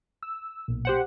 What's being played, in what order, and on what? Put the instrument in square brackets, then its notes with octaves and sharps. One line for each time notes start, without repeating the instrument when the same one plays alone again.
[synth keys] E6
B1 A#2
[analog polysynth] G4 C5 F#5